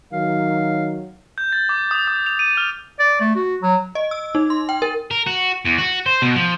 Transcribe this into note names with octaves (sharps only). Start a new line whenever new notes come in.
D#3 F#3 F5
G6
A6
D6
D#6
D#6
F7
D#7
F6
D5
A3
F#4
F#3
D#5
E6
D#4
C6
G5
A#4
A#4
F#4
E2
F#4
C5
B2
F3